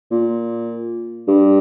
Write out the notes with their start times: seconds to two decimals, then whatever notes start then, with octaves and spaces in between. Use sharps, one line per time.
0.11 A#2
1.28 G2